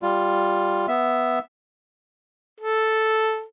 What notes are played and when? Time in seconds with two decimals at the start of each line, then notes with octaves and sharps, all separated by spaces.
0.02 G3 F4
0.88 B3 E5
2.60 A4